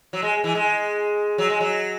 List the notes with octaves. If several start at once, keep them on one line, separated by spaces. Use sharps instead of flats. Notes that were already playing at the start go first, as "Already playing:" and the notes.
F#3
G#3
E3
G#3
F#3
G#3
F#3